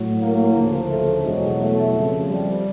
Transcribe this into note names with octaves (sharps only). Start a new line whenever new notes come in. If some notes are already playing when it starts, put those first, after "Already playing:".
Already playing: A2 F#3
A#3
D2 C#3 F3
A3
E2 B2 F#3 G#3
A3
F2 C#3 F3
G3